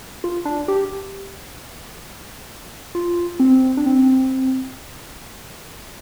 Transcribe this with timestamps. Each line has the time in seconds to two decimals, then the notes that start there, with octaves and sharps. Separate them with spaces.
0.24 F4
0.45 D4
0.68 G4
2.95 F4
3.40 C4
3.77 D4
3.86 C4